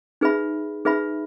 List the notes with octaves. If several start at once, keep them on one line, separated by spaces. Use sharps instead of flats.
D#4 G#4 B4 E5 B5
D#4 G#4 B4 E5 B5